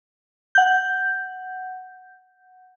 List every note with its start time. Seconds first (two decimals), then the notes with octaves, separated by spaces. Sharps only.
0.55 F#5 G6